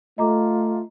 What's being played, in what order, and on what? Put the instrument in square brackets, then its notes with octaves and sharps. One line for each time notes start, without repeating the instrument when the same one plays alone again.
[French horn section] A3 [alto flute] F4 [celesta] D#5 A#5 D6